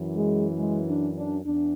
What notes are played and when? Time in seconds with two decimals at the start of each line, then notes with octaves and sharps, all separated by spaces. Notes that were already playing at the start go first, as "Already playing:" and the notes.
Already playing: F#2 E3
0.16 G#3
0.58 G#3
0.87 D4
1.16 D4
1.45 E2 D4